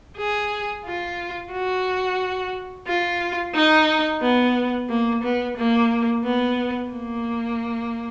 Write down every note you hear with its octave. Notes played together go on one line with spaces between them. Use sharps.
G#4
F4
F#4
F4
D#4
B3
A#3
B3
A#3
B3
A#3